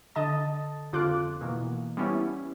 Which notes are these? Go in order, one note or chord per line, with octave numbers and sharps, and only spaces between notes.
D3 D#5 A5 A6
G1 F2 D3 F4 D6 F#6
B2 E3 A#3
G3 B3 C#4 E4